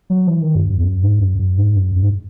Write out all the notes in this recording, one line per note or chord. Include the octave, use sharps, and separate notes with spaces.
F#3
E3
D#3
F#2
F#2
E2
F#2
G#2
F#2
F#2
G#2
F#2
F#2
G#2